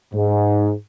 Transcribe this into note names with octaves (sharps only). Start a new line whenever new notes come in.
G#2